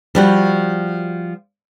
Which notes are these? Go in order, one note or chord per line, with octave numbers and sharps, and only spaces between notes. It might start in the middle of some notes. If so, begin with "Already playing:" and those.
F3 G3 F#4